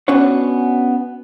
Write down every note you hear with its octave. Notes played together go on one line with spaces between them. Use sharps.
B3 C#4 D4 F#4 B4 C#5